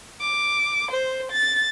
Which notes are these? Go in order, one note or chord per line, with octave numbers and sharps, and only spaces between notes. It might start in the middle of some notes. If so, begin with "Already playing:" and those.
D6
C5
A6